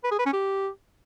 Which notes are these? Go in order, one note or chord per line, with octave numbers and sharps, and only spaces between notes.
B4
G#4
B4
C#4
G4